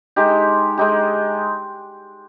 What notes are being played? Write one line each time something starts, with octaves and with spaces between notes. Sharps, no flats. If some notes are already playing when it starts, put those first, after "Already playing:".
G#3 D#4 G4
G#3 D#4 G4